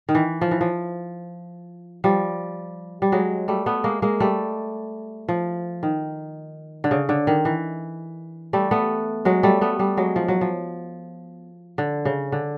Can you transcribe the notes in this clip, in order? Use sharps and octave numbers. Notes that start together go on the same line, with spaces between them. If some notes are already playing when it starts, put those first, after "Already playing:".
D#3
E3
F3
E3
F3
F3 G3
G3
F#3 G#3
G3 A3
A3 B3
G#3 A#3
G#3 A#3
G3 A3
F3
D#3
D3
C#3
D3
D#3
E3
G3 A3
A3 B3
F#3 G#3
G3 A3
A3 B3
G3 A3
F#3 G#3
F3
F#3
F3
D3
C#3
D3